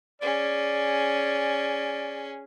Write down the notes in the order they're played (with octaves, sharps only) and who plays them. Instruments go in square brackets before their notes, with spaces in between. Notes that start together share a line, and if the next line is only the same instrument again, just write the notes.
[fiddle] C#4 G#4 [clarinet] D5